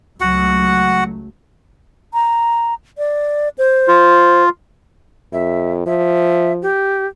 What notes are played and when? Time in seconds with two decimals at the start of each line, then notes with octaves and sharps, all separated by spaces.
0.21 C#2 F#3 A3 F#4 F#5
2.14 A#5
2.98 D5
3.58 C5
3.88 F4
5.33 F2 E5
5.87 F3 E5
6.62 G4